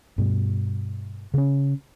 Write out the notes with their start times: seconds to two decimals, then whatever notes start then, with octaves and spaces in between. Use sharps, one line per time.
0.18 G2 B2
1.34 C#3 C#4